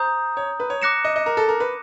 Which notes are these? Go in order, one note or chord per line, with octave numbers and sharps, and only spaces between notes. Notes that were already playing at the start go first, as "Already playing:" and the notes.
Already playing: C5 A#5 D#6 G6
C#5
B4
C#5
D6 F#6 A#6 C#7 E7
D#5
D#5
A#4
A4
A#4
B4